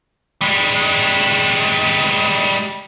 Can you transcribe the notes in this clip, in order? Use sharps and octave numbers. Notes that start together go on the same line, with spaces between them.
G3 G#3